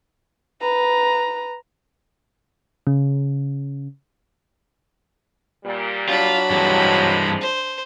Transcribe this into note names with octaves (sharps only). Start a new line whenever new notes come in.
B4 A#5
C#3
A#2 G3
F#3 D4 F4 B5
G2 C3 E3 F3 G#3
C5